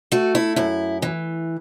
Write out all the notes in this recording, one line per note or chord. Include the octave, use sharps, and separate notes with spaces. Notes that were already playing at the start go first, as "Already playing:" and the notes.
A3 F#4
E4
F#2 E4
E3